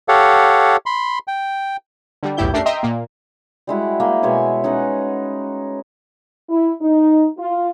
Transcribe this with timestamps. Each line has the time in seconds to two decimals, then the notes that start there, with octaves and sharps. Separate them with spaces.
0.09 G4 A4 C#5 F5 F#5
0.86 B5 C6
1.28 G5
2.23 D3 G3
2.37 B1 E2 A2 G3 E4 G6
2.53 F#2 A3 D4 G4 A#4 C7
2.66 D#5 E5 G5 A#5 C6 D#6
2.83 A#2 A#3
3.67 G3 G#3 E4 F#4
4.00 A#3 G#4 E5 G5
4.23 B2 G#3 C#5 G#5
4.64 C#4 D#4 B4 F#5
6.50 E4
6.80 D#4
7.38 F4